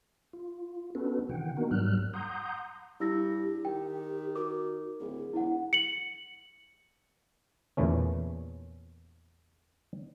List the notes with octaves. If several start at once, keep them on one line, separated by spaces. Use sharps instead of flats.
F4
B3 C#4 D4 F#4 A4 B4
C3 D#3 E3 F#5 G5
A#3 B3 D4 D#4 F#4 A#4
G#2 F#3 G3 F6 F#6
F#5 A#5 C6 D#6 G6
G2 E4 G4 E6 A#6
D#3 G5
F#4 A#4 D6
D1 G#4
E1 E4 F#5
C#7 F#7
E2 A#2 E3 A3 C#4